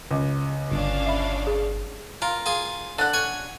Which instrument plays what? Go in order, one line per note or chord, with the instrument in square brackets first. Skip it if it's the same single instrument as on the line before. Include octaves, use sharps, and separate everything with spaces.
[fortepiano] C#2
[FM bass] G1 [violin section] C#4 D4 F5
[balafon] E5 B5
G#4
[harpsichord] F4 [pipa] A#4
[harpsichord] F4 G#4
[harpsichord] D3 [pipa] D4 F#5
[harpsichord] C#5 G#5